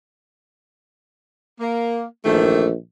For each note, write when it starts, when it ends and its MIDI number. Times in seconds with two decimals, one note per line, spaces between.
1.60 2.02 58
2.25 2.74 34
2.25 2.67 51
2.25 2.67 52
2.25 2.67 57